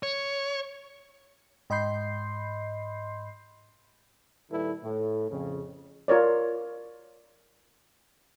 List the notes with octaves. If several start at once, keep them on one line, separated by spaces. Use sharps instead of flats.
C#5
G#2 D#5 B5 C6 G6 C7
A#2 D#3 G3 E4 A4 B4
A2
F2 C#3
F4 A#4 C#5 D5